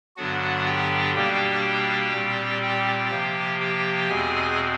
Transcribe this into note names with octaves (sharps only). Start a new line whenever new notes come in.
G2 D3 F#3 B3 D4 F#4 F#5
G4 G5
B2 G3 A#3 D4 G4 G5
A#2 G3 C4
G4 G5
C3 F3 A#3
G4 G5
E2 B2 G#3 C4 G#4 G#5